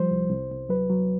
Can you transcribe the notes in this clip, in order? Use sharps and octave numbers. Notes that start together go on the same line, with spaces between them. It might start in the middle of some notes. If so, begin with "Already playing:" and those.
Already playing: F3 G3 C5
C2
C2
C2
F#3 B4
F#3